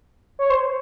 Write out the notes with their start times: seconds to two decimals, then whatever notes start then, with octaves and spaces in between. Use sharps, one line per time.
0.39 C#5
0.50 C5